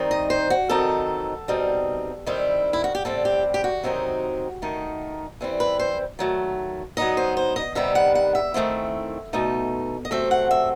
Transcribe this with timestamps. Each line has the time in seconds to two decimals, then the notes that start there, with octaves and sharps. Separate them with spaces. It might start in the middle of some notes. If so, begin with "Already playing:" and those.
Already playing: D#3 G3 C4 D#4
0.11 D#5
0.30 C5
0.50 F#4
0.69 D#3 F#3 C4 D#4 A4
1.48 B2 G3 C4 D#4
2.26 D#3 G3 C4 E4
2.73 E4
2.84 F#4
2.95 G4
3.05 A2 G3 C4 A4
3.25 G4
3.54 G4
3.64 F#4
3.83 C3 D#3 F#3 C4 D#4
4.62 D#3 A3 D#4
5.41 E3 G3 C4 E4
5.60 B4
5.79 C5
6.19 D#3 F#3 A3
6.97 F#3 B3 D#4 D#5
7.17 C5
7.37 C5
7.56 D#5
7.75 C3 D#3 G3 B3 E5
7.95 F#5
8.15 F#5
8.35 E5
8.54 D#3 A3 C4 E4
9.33 B2 A3 D#4
10.05 D#5
10.11 C3 F#3 A3 C4 E5
10.31 F#5
10.51 E5